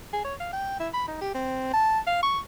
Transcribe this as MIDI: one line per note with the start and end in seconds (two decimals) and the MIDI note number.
0.13 0.22 68
0.25 0.34 73
0.40 0.48 77
0.53 0.76 79
0.80 0.88 64
0.94 1.07 83
1.07 1.19 63
1.21 1.33 67
1.34 1.73 60
1.73 1.99 81
2.07 2.21 77
2.23 2.39 85